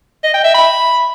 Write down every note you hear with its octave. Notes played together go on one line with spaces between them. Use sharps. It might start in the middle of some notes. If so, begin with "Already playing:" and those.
D#5
G5
E5
B5